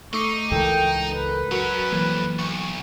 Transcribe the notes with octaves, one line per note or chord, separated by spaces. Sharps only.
A3 D#4 C#6 D6 C7
C#2 G#2 E3 A4 A#4 G5
B4
F#3 C#4 F#4 A#4
F2 E3 F#3 A#3
B1 C#6